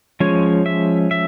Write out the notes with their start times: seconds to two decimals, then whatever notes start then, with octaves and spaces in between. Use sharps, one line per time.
0.20 F3 G#3 C#4 C#5
0.66 E5
1.11 E5